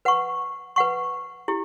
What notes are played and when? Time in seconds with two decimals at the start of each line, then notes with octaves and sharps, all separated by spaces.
0.05 B4 F#5 C#6
0.76 B4 F#5 C#6
1.48 E4 G4